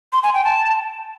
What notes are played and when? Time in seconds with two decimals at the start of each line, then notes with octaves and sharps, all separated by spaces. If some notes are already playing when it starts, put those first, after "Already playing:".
0.13 C6
0.23 G#5
0.34 G5
0.45 A5